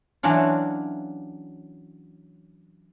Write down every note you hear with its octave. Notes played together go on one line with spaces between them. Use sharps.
E3 F#3 C#4 D4 F4